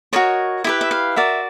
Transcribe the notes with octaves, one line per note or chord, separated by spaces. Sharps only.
F#4 A#4 C#5 D#5
E4 G4 B4 E5
E5
F5
F#4 A#4 D5 E5